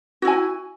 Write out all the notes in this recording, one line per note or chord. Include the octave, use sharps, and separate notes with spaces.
E4 F#4 G#5